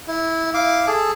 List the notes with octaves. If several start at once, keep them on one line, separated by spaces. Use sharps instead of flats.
E4
E4 F5 D6
G#4 A4